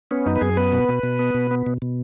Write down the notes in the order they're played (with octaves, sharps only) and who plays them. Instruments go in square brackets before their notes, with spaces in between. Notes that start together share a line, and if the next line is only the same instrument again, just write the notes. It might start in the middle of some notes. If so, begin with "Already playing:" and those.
[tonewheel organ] B3 C#4
F#2 D#4
B4
F#2 G#4
B3 B4
B2
B2
B2
B3
B2
B3
B2
B2